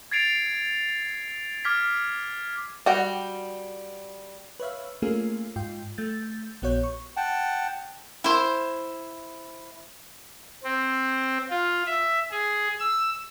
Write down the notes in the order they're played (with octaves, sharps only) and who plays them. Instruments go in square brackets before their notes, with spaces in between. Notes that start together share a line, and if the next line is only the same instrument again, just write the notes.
[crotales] G#6 A6 C7 D7 F7
D6 F6 G#6 B6
[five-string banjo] G3 F#4 G5
[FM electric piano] B4 C#5 E5 F5
A3 A#3 C#4 F4 G#4 A#4
G#2 F4 G5
A3 G6 A6
A#1 B3 F#4 C#5 G6
C#6
[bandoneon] F#5 G5 A5
[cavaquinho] E4 C5
[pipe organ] C4
F4
E5
G#4
E6